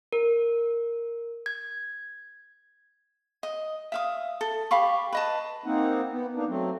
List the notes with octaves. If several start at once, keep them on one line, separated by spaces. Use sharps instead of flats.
A#4
G#6
D#5
E5 F5 D#6
A4
G4 F5 B5 C#6
B4 D#5 A5
A#3 C4 D#4 F#5
B3
A#3 D4 D#4
F#3 A3 C4